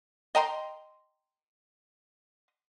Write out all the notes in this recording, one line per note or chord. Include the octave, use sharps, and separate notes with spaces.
D#5 G5 A#5 C6